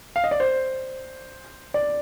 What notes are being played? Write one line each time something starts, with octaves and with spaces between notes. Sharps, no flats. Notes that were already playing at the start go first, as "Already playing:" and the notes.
F5
D#5
D5
C5
D5